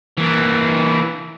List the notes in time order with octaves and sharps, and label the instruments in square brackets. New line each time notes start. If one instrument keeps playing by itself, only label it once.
[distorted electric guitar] E3 A#3